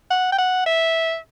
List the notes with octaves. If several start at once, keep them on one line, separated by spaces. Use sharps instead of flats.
F#5
G5
F#5
E5